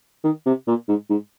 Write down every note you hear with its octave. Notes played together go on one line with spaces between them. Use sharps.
D#3
C3
A#2
G#2
G#2